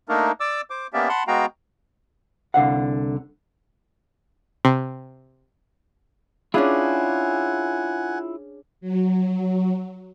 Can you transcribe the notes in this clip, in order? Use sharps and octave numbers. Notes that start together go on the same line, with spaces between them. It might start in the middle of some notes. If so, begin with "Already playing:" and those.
A3 A#3 D4 D#4 A#4
D5 D6 E6
C5 D6
A#3 B3 C#4 G4 D5 E5
F#5 A5 B5 C6
G#3 B3 F#4 F5 G5 A#5
C2 D3 F5 F#5
C3
C#4 D4 E4 F4 G#4 F#5 G#5
F#3